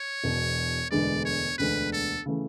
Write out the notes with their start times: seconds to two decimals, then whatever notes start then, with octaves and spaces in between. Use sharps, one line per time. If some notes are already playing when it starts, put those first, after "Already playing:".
Already playing: C#5
0.24 E1 E2 B2
0.91 E1 D2 D3 G#3 B3 D5
1.25 C#5
1.58 E1 D2 D3 G#3 B3 B4
1.93 A4
2.26 C#3 E3 A3